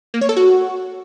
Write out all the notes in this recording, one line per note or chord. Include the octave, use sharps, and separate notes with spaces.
A#3
C#5
A4
F#4